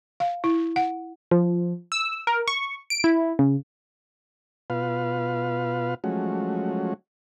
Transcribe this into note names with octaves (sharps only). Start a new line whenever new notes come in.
F5
E4
F#5
F3
E6
A#4
C#6
D7
E4
C#3
B2 F4 B4 F5
F3 F#3 G#3 A3 C#4 F#4